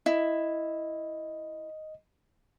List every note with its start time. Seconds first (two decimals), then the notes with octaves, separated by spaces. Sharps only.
0.06 E4 D#5